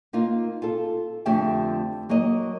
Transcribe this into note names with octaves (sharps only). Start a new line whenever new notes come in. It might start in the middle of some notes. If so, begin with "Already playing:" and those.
A#3 D#4 F4
F4 A4
F2 D3 A3 G4 E5 G5
F#3 A#3 C#5 D#5